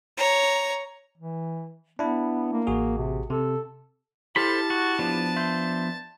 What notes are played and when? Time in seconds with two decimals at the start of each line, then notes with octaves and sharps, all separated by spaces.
0.17 C#5 A#5
1.18 E3
1.99 B3 D4 E4
2.53 A#3
2.67 A1 F#4 G#4
2.97 C3
3.30 C3 A4
4.36 E4 G4 A4 C5 A5 B5 F6
4.70 F#4
4.99 F3 B3 D4
5.36 E5 C6 G6